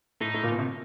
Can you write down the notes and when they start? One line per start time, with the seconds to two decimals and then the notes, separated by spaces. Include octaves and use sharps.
0.21 A2 D#4
0.34 A2
0.43 A#2
0.51 B2
0.59 C3